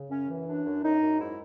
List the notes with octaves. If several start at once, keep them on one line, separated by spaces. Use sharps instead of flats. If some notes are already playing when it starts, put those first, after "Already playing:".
Already playing: C#3
F#2 C#4
E3
F#2 D4
F#2
F#2 D#4
F#2
G#2 E4